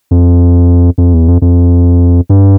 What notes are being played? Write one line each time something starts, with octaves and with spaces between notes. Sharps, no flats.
F2
F2
E2
F2
F2
G2